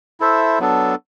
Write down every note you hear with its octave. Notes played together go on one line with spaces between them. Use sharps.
E4 A4 C5 E5
F#3 B3 D4 A4